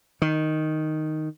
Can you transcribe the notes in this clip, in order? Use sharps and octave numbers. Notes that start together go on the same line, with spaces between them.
D#3